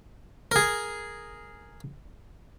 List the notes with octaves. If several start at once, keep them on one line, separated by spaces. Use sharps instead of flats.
G#4 A#4